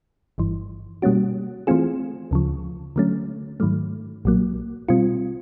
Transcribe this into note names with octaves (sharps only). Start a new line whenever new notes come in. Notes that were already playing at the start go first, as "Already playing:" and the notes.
G1 G2 E3
B2 G3 A#3 C#4 F#4
E3 A3 C4 F4 G#4
D2 C#3 F3
D3 F#3 A3 C#4
G#2 D#3 F#3 A3
B1 A#2 F#3 A#3
B2 G3 C4 F4